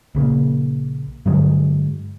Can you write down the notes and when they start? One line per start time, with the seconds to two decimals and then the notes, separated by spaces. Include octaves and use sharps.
0.15 A#1 C#3 A#3
1.26 G2 D3 F#3 G#3